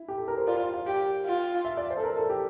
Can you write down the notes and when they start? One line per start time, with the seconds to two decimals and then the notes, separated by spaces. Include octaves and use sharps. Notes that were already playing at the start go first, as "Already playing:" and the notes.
Already playing: E4
0.08 G4
0.18 A4
0.28 A#4
0.37 C5
0.48 F4 D5
0.60 F5
0.74 F5
0.86 G4 F5
1.25 F4
1.65 E5
1.77 D5
1.90 C5
1.97 A4
2.04 A#4
2.16 A4
2.30 G4